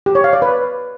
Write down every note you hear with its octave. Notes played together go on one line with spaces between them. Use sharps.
G4
C#5
F5
D5
B4